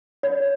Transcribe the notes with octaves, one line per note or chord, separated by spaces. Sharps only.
C#5